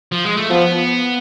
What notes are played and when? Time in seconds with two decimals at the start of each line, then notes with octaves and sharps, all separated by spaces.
0.12 F3
0.25 G#3
0.37 A3
0.50 F3 B3